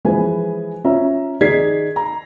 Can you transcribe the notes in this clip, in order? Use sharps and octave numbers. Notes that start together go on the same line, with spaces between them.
E3 F3 G#3 B4 G#5
C#4 F4 E5 A#5
D#3 G#4 D5 G#6 B6 C7
A#5